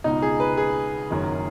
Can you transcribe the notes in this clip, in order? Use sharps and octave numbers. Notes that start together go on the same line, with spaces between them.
C#2 B2 D#4
G#4
B4
G#4
F#1 F#2 D#3